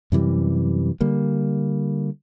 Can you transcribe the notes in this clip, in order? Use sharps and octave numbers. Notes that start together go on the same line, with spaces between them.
F#2 C3 E3 G3
D3 G3 A#3